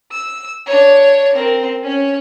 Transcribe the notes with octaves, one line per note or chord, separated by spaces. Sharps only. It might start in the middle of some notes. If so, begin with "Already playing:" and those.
E6
D4 C#5
C4 A#4
C#4 C#5